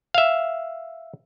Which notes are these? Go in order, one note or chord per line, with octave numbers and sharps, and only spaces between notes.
E5 F5